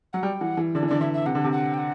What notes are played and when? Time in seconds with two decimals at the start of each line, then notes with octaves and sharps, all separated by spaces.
0.13 F#3 F#5
0.23 G3 G5
0.41 E3 F#5
0.57 E3
0.75 D3 D5
0.83 E3
0.88 D3 D5
1.01 D3 E5
1.14 E5
1.26 C3 F#5
1.35 D3
1.44 C3
1.52 F#5
1.74 G5
1.78 F#5